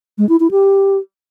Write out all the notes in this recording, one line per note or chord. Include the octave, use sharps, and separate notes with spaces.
G#3
E4
E4
G4